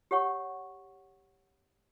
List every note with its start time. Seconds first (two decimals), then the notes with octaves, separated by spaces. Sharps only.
0.11 G4 C#5 F#5 C#6